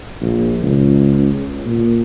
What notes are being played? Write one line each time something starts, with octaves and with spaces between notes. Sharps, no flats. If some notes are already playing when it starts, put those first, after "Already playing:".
A#1
C#2
A#2